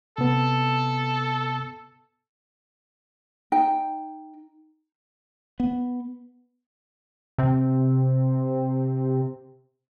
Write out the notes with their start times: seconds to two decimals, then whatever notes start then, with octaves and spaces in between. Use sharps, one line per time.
0.18 C3 B3 A4
3.52 D#4 G5
5.60 B3
7.38 C3 C4